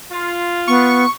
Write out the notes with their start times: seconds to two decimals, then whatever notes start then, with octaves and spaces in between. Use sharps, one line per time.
0.12 F4
0.68 B3 C#6